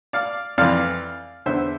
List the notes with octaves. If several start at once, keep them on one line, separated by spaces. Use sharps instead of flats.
D5 F5
F2 E3 D5 F5
E2 D3 C5 E5